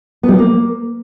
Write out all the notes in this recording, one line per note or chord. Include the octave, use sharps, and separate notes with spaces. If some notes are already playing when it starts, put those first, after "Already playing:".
B3
G3
B3
A#3